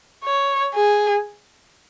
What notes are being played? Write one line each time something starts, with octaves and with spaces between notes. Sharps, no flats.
C#5
G#4